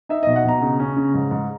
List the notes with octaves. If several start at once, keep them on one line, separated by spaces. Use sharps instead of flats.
D#4 E5
B2 D#5
F#5
B2 A#5
C#3
C#4
C#3
G#2
G#2